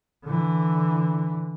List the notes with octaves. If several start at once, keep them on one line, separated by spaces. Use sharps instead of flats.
D3 E3